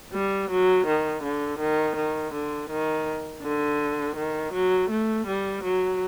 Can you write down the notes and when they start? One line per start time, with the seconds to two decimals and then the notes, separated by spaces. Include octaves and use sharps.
0.13 G3
0.51 F#3
0.87 D#3
1.23 D3
1.60 D#3
1.97 D#3
2.34 D3
2.70 D#3
3.43 D3
4.17 D#3
4.54 F#3
4.91 A3
5.27 G3
5.64 F#3